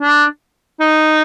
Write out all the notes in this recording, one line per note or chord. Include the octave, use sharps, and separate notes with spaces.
D4
D#4